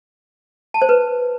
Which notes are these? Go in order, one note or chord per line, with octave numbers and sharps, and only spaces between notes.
A5
C5
B4